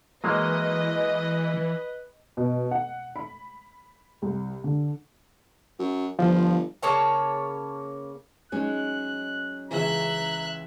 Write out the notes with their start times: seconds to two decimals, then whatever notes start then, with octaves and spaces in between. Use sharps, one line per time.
0.24 E3 F#3 G#3 A#3 B4 D#5
2.37 B2
2.71 F#5
3.16 B5
4.22 C2
4.64 D3
5.79 F#2
6.19 G1 F3
6.83 C#3 A#3 C#5 A5
8.52 F#3 G#3 C#4 D#4 F#6
9.71 C#2 C#3 E3 E5 A#5 F#6